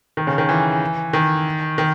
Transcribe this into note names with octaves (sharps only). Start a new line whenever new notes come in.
D#3
C#3
D#3
E3
D#3
D#3